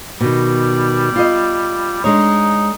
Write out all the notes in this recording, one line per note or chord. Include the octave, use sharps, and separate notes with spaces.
B2 D#3 G3
F4 D#5
G#3 D4 D#4 C#5